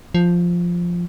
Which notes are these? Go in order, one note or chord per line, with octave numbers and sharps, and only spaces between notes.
F3